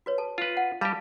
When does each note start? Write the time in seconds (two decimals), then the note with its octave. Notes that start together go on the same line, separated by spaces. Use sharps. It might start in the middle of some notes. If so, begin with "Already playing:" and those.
0.06 F#4 B4 C#5
0.18 A4 A5
0.38 F4 B4
0.57 F#5
0.81 G3 G4 F5 A5 B5